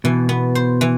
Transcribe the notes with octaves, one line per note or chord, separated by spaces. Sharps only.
B2 E3
B3
C5
E3